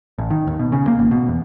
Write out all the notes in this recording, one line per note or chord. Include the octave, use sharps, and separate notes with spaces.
A1
D#3
D#2
B2
C#3
A#3
G#1
B2
E2